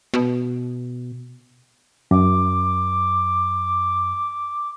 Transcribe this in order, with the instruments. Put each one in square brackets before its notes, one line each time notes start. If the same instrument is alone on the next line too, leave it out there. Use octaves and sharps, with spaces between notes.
[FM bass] B2
[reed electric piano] F#2 [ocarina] D6